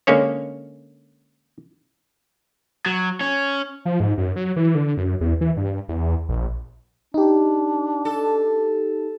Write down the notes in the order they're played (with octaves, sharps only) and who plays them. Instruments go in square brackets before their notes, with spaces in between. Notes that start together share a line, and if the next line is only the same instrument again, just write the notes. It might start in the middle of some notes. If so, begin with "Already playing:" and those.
[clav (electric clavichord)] D3 G#3 A#3 C#4 C#5
[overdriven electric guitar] F#3
C#4
[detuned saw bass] F3
G#2
F#2
F#3
E3
D3
F#2
E2
E3
G2
E2
A#1
[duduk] D4 [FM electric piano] D#4 G4
[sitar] A4